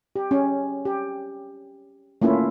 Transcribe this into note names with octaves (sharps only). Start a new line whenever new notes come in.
G4
C#4
G4
A3 A#3 C#4 E4 F4